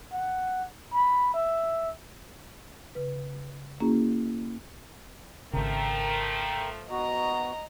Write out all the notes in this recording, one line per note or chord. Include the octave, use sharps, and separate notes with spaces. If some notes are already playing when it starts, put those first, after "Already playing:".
F#5
B5
E5
C#3 B4
A#3 C#4 E4 F#4 G#4 A#5
G#1 C#3 F3 A3 A#4 G5
B3 F#4 D#5 A#5